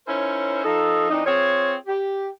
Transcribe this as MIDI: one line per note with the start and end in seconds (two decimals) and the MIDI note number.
0.07 0.61 61
0.07 0.61 63
0.07 0.61 64
0.07 0.61 70
0.07 0.61 72
0.07 0.61 73
0.63 1.08 53
0.63 1.08 63
0.63 1.08 69
1.10 1.24 52
1.10 1.24 60
1.10 1.24 62
1.10 1.24 63
1.25 1.74 60
1.25 1.74 65
1.25 1.74 68
1.25 1.74 73
1.87 2.27 67